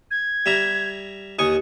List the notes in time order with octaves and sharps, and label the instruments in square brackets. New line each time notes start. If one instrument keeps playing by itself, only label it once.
[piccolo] G#6
[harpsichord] G3 E5 A#5
[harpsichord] D#2 G#5 C#6 [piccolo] D#6